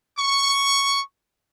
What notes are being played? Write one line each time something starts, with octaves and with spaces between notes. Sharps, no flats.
C#6